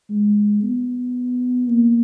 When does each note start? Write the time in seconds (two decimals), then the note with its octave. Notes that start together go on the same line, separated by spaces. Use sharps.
0.10 G#3
0.63 B3
1.69 A#3